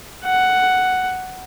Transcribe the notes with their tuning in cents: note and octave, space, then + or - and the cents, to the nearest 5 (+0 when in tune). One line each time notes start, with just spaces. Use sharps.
F#5 +5